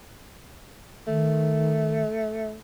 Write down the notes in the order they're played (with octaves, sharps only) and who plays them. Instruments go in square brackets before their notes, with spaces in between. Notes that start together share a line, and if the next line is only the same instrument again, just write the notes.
[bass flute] D#3 [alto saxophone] A3